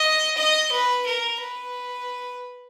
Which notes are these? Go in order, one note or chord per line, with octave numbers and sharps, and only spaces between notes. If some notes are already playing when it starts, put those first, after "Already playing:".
Already playing: D#5
D#5
B4
A#4
B4